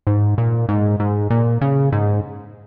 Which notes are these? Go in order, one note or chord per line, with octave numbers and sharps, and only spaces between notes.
G#2
A#2
G#2
G#2
A#2
C#3
G#2